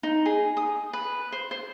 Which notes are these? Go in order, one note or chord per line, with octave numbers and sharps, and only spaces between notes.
D#4
G#4
D#6
B4
C5
C5